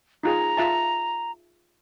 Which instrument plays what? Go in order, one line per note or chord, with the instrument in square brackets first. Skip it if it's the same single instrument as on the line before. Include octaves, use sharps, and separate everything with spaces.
[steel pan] D#4 F4 G#4 [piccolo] A#5
[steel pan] F4 E5 A5